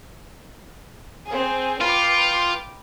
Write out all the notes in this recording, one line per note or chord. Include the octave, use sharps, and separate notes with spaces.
C4 G#4
F4 B4 G5 D6